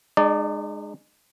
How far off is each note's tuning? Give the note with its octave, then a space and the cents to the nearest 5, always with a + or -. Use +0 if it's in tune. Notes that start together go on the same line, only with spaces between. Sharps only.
G#3 +0 D#4 -40 D5 +0